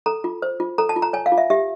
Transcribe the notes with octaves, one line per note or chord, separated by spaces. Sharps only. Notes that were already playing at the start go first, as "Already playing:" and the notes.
A4 A#5
F4
C5
F4
A4 A#5
A5
F4
A#5
C#5 G#5
F5
F4
E5
G4 E5